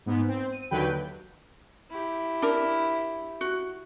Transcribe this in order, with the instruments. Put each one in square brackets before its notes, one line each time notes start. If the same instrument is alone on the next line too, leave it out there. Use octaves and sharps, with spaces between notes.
[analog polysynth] G#2 B3
C4
D#7
D#2 D3 F#3 B4 G5
[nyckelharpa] E4 G4
[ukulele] D4 A#4
F#4